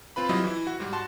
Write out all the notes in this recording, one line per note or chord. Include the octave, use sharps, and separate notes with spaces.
C4 F4 B4 B5
F#3 G3 C4 E4 F4 D#5
E3 E4
F#4
G#2 G3
F#4 A5 C6